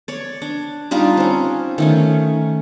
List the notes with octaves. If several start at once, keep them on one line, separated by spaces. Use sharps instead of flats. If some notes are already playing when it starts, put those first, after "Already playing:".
C#5 D5
D4
G3 D4 D#4 F4
C4 C#4
D#3 A3 C#4